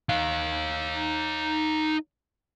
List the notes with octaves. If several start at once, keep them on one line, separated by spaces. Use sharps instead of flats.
D#4 F5